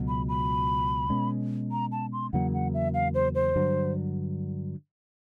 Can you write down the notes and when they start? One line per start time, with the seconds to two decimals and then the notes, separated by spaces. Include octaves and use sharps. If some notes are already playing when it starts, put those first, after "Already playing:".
Already playing: C#2 B2 F#3
0.08 B5
0.29 B5
1.10 B2 G#3 C#4
1.71 A#5
1.92 A5
2.13 C6
2.33 E2 C#3 F#3 A#3 F#5
2.53 F#5
2.74 E5
2.94 F5
3.14 C5
3.35 C5
3.56 G2 D3 F#3